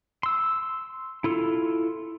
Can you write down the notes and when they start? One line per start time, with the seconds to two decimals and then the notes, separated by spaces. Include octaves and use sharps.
0.23 C6 E6
1.24 E4 F4 A4